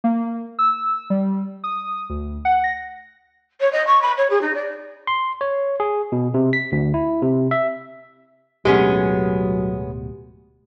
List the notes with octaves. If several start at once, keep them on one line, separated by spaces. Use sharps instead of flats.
A#3
E6
G3
D#6
D2
F#5
A#6
C#5
D#5
C#6
B5
C#5
G#4
D#4
D5
C6
C#5
G#4
B2
C3
B6
D2
E4
C3
E5
D1 B2 F#3 G#3 A3 B3 C#4 G4